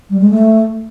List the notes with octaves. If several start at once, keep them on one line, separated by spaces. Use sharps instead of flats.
G3
G#3
A3